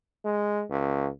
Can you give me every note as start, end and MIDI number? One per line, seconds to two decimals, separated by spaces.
0.25 0.63 56
0.70 1.08 37